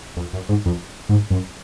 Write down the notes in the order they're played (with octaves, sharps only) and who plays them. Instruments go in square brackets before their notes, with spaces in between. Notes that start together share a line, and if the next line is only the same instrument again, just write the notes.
[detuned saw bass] F2
F#2
G#2
F2
G#2
F#2